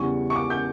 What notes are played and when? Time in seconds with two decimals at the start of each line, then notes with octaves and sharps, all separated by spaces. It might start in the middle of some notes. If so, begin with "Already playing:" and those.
Already playing: E2 C#3 G3 C#4 E4 C#6
0.30 C#6
0.36 D6
0.50 G6